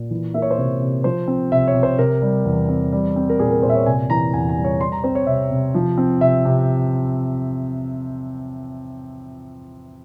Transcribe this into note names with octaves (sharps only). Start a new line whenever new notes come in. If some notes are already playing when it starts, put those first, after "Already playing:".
Already playing: A#2
E3
A#3 E5
C#5
C5
C3 C#5
C3
F3 C5
C4
C3 E5
C#5
C3
C5
C3 A#4
G3
E2
C4
G3
C4
A#4
A#2 G#4
A#4
A#2 C5
E5
C#5
C3 G#5
E3 A#5
E2 G#5
G#5
G3
C#5
G3 C6
A#5
C4 C5
C#5
C3 E5
C3
F3
C4
C3 E5
C3